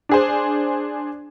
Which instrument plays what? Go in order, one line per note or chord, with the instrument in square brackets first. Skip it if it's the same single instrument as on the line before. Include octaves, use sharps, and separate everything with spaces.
[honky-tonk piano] D4 G#4 C5